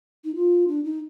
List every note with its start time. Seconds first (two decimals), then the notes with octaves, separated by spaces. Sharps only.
0.25 D#4
0.35 F4
0.68 D4
0.84 D#4